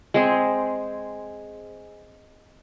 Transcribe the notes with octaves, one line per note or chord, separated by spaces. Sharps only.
G#3 C4 G#4